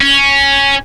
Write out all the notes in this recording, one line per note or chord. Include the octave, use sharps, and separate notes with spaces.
C#4